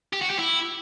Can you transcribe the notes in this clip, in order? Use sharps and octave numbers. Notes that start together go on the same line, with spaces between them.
G4
F#4
G4
E4